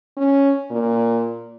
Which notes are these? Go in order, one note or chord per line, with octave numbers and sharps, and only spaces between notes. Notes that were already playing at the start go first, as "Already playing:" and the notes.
C#4
A#2